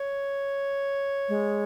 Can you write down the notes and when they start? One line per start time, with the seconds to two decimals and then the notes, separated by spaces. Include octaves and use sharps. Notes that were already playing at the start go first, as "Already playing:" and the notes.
Already playing: C#5
1.29 G#3